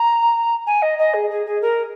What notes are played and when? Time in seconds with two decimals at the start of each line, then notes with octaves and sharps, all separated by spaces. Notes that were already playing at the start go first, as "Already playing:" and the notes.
Already playing: A#5
0.66 G#5
0.82 D#5
0.98 D#5
1.13 G#4
1.30 G#4
1.46 G#4
1.61 A#4